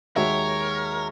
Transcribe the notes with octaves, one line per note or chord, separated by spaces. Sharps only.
D#2 G#3 F#4 A#4 C#5 E5